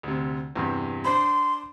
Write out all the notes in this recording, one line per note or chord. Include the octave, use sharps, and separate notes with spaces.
D2 C3
E2 G2 C3
D4 C5 B5 C6